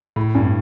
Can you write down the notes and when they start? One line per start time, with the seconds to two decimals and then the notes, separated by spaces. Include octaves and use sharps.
0.16 A2
0.35 G2